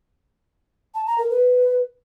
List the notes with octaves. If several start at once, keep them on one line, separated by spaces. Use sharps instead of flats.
A5
A#5
A#4
B4